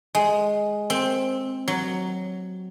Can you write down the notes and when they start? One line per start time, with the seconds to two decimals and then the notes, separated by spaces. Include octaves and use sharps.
0.15 G#3
0.90 C4
1.68 F#3